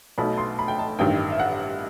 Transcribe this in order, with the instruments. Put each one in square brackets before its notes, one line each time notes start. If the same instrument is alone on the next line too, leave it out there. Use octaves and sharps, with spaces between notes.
[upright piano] B1 B2 A3 D#4 B5
C6
B5
G5
A5
A1 G2 D#3 G5
E5
F#5